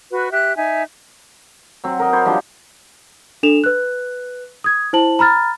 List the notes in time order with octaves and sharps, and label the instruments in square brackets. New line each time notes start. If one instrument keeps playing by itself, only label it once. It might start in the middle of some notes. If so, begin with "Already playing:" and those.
[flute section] F#4 B4
G4 E5 F#6
D#4 E5 G#5
[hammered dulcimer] F#3 C4
A#4 D#5
C5 C#5 B5
F3 G3 D4 G4
[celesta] D4 A4 E7 F7
B4 F#6
D#6 G#6
E4 C5 A5 F#7
A#5 B5 F6 A6